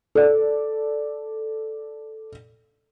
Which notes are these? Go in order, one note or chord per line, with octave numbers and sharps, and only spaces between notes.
A4 D5